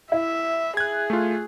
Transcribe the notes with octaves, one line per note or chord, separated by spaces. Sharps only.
E4 E5
G#4 F#6 G#6
A3 F4